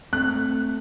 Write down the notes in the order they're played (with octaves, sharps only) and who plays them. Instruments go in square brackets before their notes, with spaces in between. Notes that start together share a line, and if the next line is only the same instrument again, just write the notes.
[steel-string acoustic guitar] A3 [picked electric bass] C4 [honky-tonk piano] F#6